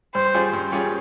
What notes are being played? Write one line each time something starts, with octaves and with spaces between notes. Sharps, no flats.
G2 C5
G3 C#4 F4 G#4
G2
G3 C#4 F4 G#4